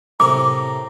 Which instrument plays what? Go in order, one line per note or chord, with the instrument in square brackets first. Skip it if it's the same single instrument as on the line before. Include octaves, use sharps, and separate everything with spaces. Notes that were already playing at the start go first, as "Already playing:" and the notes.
[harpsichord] A2 C3 A#4 [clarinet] A#5 [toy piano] D6